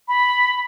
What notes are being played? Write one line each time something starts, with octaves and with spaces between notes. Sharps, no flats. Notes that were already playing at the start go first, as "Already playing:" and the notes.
B5